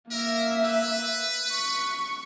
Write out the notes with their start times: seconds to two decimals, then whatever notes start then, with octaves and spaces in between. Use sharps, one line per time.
0.11 A#3 A#4 E5
0.64 B4
1.53 C#6